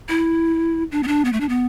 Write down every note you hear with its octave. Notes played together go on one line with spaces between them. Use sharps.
E4
D4
B3
D4
B3
A3
D4
B3